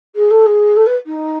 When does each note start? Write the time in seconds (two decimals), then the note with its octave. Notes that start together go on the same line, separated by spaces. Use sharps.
0.15 G#4
0.30 A4
0.45 G#4
0.76 A4
0.86 B4
1.06 D#4